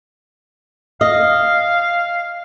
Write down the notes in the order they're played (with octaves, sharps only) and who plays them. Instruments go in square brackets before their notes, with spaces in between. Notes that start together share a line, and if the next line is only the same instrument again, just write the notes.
[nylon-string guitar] D#5 [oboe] F5